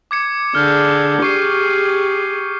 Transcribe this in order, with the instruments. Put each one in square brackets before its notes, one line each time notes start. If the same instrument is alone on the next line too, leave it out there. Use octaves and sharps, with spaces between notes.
[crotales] D6 G#6 C#7
[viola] D3 G#4 [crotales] F6 G6
[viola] G4 G#4 [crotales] C#6 C7 D#7